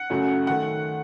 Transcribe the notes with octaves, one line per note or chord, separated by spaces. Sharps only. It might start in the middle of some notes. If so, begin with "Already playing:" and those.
Already playing: F#5
F#2 C#3 F#3 A3
D#3 A3 F#5